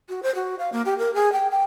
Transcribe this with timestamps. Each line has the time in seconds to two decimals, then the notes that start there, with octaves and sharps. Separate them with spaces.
0.09 F#4
0.23 C5
0.35 F#4
0.59 F5
0.72 A#3
0.85 G4
0.98 A#4
1.14 G#4
1.33 G5
1.51 G5